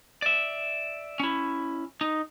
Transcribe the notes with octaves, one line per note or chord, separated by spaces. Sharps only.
D5 E5
C#4 E4
D#4